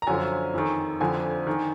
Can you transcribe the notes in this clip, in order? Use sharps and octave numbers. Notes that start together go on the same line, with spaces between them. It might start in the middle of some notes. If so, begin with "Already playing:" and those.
A#5
F#2 D3 F3 G#5
F2 D#3
F2 D3 F3 G#5
D#3